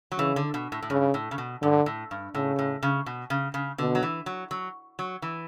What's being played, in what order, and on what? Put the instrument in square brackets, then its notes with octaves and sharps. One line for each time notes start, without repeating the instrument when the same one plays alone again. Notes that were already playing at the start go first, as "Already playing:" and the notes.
[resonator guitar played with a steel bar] F#3
[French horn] C#3 [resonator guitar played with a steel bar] E3
[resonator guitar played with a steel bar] D3
B2
A2
A2
[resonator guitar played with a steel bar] G2 [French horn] C#3
[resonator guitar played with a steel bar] A2
C#3
B2
[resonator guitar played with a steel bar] G2 [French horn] D3
[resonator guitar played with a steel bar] A2
G2
[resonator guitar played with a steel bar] A2 [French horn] C#3
[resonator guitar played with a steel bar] A2
C#3
B2
C#3
C#3
[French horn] B2 [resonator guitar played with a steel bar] D3
[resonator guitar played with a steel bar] F#3
E3
F#3
F#3
F#3
E3